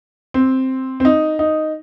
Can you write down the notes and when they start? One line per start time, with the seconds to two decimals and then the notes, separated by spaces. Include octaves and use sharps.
0.34 C4
1.00 C4
1.05 D#4
1.39 D#4